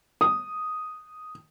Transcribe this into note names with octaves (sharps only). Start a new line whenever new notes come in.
D#6